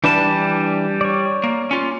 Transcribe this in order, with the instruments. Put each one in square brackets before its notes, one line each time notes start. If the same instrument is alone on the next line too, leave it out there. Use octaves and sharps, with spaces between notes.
[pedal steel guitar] E3 D4 B4 [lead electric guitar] G3 A5
[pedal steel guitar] C#5 D5
[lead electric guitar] A#3
C#4 F4